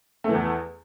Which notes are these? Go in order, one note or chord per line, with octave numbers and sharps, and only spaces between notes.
E2 E3 A3